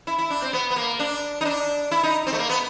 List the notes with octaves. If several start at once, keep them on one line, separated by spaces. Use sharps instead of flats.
E4
E4
D4
C4
B3
B3
A#3
D4
D#4
D4
E4
D#4
C4
A3
A#3
B3